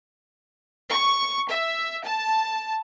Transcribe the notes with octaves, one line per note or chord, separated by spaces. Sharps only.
C#6
E5
A5